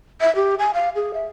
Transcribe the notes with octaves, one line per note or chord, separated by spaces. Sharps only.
E5
G4
G#5
F5
G#4
E5